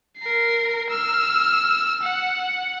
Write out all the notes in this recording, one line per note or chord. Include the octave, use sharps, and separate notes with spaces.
A#4 C7
E6 F6
F#5